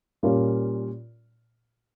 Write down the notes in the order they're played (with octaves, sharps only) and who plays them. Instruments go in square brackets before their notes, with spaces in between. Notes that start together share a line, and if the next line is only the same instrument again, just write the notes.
[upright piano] A#2 G3 C#4 F4 A#4